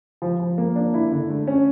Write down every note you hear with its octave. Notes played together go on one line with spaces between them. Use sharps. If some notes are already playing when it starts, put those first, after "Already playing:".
F3
F3
A#3
D4
E4
D3
A3
C#4